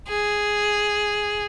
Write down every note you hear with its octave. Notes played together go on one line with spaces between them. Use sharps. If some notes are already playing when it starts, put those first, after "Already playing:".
G#4